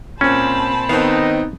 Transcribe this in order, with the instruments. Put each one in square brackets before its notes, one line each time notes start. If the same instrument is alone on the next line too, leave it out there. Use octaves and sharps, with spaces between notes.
[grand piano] A#2 C4 [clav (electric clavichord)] C#4 [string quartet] C5 A5 B5
[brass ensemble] D#3 D#4 [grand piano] B3 C4 [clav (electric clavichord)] F5